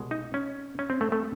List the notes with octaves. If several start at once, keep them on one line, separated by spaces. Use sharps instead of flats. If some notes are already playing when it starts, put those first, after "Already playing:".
Already playing: C2 B2 G#3
D#4
C#4
C#4
C4
A3
A3